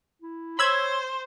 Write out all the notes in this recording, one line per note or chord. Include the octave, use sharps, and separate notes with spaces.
E4
C5 C#5 B5 E6 G#6